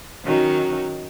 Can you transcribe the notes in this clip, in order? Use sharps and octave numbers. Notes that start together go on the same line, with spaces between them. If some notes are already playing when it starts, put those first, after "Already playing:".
D#3 F#3 C#4 D#4